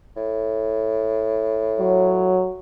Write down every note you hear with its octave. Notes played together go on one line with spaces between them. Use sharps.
A2
F#3